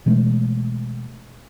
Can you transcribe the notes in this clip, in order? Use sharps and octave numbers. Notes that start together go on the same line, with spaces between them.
B2 E3 G#3 A3